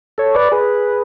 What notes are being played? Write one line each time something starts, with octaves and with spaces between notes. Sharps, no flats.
A4 C#5
B4 D5
G#4 B4